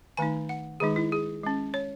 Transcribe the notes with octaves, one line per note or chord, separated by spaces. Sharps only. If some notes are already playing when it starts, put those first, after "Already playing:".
D#3 A3 D#4 G#5
F#5
D#3 G#3 D#4 G#4
E4
G#4
G#3 C#4
C#5